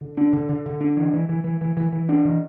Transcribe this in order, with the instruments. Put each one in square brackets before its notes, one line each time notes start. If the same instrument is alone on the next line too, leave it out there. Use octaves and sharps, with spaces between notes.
[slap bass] D3
D4
D3
D3
D3
D4
E3
E3
E3
E3
E3
E3
E3
D4
E3